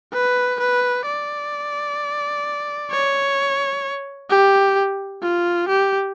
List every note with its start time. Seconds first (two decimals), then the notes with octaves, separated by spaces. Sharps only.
0.13 B4
0.60 B4
1.06 D5
2.91 C#5
4.30 G4
5.23 F4
5.69 G4